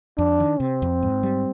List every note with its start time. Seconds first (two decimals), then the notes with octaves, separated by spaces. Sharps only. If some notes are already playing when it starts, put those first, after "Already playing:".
0.18 F2 D4
0.40 D#3
0.60 C3 C4
0.82 F2
1.03 G#2
1.23 G3